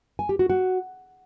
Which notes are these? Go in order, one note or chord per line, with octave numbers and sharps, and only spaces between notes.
G#5
G4
F#4
F#4